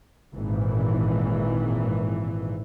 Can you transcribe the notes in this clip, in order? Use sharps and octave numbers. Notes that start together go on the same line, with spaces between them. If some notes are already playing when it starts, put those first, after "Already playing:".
G#1 A#2 E3